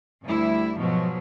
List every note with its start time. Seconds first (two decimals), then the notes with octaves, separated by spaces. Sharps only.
0.23 D2 G3 E4
0.77 G#2 B2 F3 F#3